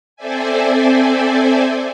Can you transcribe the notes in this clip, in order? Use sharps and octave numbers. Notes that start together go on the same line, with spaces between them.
C4 A4 C5 D5 E5 G#5